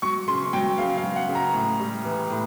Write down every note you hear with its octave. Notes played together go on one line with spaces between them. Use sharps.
F#3 C#6
C#3 C6
F#3 G5
C#3 F5
F5
F#3
F#5
C#3
A#5
A2
G3
E3
A2